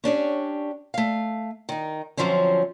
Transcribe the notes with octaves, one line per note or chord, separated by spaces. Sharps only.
C#4 D4 G4 C#5
A3 F5
D#3 D#4
F#2 D3 F3 F#3 C4 C#4